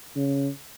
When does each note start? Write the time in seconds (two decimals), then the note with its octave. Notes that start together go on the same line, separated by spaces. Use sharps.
0.16 C#3